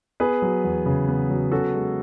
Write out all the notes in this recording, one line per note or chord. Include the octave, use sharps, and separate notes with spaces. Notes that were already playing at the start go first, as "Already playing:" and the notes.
B3 G#4 B4
F#3
E2
C#3
B3
F#3
C#4 F#4 A4
G#3